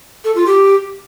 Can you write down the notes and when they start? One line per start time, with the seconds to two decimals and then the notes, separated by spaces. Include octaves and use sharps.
0.24 A4
0.35 F4
0.46 G4